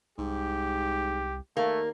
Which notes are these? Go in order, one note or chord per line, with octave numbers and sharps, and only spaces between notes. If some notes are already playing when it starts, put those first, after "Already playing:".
C2 G#2 G4
D#2 A3 A#3